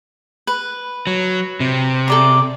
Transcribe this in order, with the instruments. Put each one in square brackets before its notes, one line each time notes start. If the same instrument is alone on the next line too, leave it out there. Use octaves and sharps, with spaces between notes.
[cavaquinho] B4
[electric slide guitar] F#3
C3
[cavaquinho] A4 D5 A#5